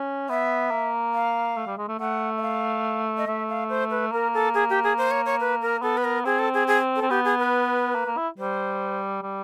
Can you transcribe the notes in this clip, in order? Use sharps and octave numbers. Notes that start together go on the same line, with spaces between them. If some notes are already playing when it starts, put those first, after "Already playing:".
Already playing: C#4
B3 E5
A#3
F5
A3
G3
G#3
A3
A3 F#5
E5
F5
D#5
A3 E5
F5
C5
B4
A#3 A#4
A4
G#4
G4
G#4
C5
C#5
C#5
B4
A#4
B3 A4
B4
A#4
C4 G#4
A4
G#4
G#4
A4
C4
B3 G4
G#4
B4
A#3
A#3
E4
G3 C5
G3